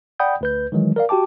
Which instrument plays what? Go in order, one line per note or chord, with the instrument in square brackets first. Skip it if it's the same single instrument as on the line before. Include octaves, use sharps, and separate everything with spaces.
[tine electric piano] D5 F#5 G5 B5 D#6 G6
D2 B4 G6
D#3 E3 F#3 G#3
A#4 D5 F5
F#4 G4 G5 A5 D6